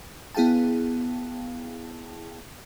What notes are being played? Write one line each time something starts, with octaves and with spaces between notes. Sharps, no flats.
B3 E4 G#4 F5 G5 A5